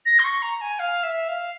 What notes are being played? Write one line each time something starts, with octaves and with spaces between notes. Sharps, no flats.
A#6
C6
C#6
A#5
G#5
F5
E5
F5